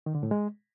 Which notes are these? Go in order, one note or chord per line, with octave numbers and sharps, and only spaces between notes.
D#3
D3
A2
G#3